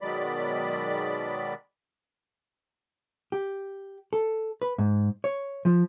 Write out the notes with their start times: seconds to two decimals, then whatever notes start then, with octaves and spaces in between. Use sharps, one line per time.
0.01 B2 D#3 F#3 G#3 D5 B5
3.32 G4
4.13 A4
4.62 B4
4.78 G#2
5.24 C#5
5.65 F3